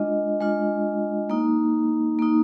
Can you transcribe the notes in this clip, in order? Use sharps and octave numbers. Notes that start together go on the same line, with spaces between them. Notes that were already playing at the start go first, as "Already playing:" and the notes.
Already playing: G#3 D4 F4 D#5
G#3 D4 F4
A#3 D#4
A#3 D#4